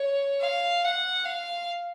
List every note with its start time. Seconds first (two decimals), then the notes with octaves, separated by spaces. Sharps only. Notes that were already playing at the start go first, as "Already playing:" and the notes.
Already playing: C#5
0.41 F5
0.84 F#5
1.25 F5